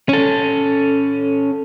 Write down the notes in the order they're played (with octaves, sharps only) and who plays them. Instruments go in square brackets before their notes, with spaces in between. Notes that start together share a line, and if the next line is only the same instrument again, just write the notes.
[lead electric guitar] C#4 A4